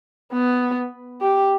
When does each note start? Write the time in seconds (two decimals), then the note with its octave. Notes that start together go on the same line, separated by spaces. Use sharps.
0.33 B3
1.21 G4